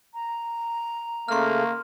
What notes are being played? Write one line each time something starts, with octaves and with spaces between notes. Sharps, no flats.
A#5
C#3 A3 A#3 C6 F6